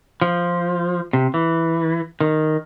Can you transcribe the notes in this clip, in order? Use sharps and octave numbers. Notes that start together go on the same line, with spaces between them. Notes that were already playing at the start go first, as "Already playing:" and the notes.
F3
C3
E3
D#3